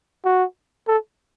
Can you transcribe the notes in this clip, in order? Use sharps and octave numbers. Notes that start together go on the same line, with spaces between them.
F#4
A4